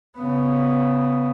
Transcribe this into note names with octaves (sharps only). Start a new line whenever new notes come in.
C#3 B3